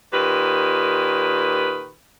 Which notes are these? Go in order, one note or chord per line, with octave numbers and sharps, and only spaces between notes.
A#2 D#3 G4 B4